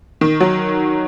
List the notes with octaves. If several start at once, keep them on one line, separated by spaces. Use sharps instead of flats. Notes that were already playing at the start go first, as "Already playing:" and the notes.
D#3
F#3